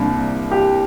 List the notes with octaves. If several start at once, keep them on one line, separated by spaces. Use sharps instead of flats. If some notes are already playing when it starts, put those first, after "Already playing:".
Already playing: C2 C3 A#3 D4
G4